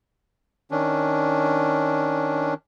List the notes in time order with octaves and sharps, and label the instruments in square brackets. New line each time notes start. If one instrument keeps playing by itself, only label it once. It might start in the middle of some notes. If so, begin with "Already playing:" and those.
[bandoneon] D#3 C#4 D4